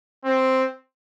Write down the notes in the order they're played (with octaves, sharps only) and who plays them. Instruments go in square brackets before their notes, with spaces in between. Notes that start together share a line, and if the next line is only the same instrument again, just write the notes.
[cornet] C4